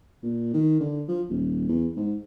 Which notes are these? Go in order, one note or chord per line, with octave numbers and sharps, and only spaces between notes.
A#2
D#3
D3
F3
D#1
E2
G#2